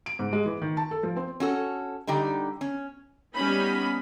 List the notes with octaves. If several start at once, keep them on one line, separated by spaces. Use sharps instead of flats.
D7
G#2
G#3
E3
D#3
A5
A4
F3
C4
C#4 F#4 A4
D3 G3 D#4 G4
C#4
G3 B3 C#4 D#4 B5